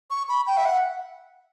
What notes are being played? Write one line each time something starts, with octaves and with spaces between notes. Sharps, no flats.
C#6
B5
G5
E5
F#5